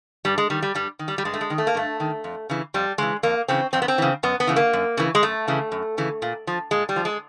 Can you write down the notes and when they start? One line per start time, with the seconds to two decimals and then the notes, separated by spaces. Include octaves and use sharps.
0.25 G2 G3
0.38 G#3
0.50 D#3 G3
0.62 G3
0.75 G2 G3
0.99 D#3
1.08 G3
1.18 G3
1.25 G2 G#3
1.34 A3
1.41 G#3
1.50 D#3
1.58 A3
1.67 A#3
1.74 G2 A3
2.00 D#3
2.24 F2
2.50 C#3 E3
2.74 F2 G3
2.98 C#3 E3 G#3
3.23 F2 A#3
3.48 C#3 E3 C4
3.73 F2 C4
3.82 B3
3.88 C4
3.98 C#3 E3
4.23 F#2 B3
4.40 B3
4.47 C#3 E3
4.56 A#3
4.73 F#2
4.97 C#3 E3
5.15 G#3
5.23 F#2 A3
5.48 C#3 E3
5.72 F#2
5.98 C#3 E3
6.22 A#2
6.47 F3
6.71 A#2 G#3
6.89 G3
6.96 F3
7.05 G#3